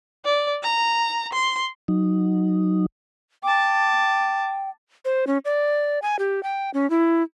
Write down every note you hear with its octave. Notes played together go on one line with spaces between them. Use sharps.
D5
A#5
C6
F#3 D#4
G5 A5 D6
C5
C#4
D5
G#5
G4
G5
C#4
E4